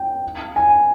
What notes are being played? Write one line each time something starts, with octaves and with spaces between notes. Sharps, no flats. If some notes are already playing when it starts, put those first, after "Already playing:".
Already playing: G5
G#5